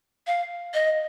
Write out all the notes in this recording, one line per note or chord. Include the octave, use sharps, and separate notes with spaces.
F5
D#5